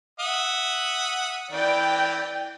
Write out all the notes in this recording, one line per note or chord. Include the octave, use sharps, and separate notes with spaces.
E5 F#5 D#6
E3 D5 G5